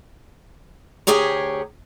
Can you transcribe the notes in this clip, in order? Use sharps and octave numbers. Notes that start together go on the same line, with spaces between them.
D2 G4 G#4 C#5 A#5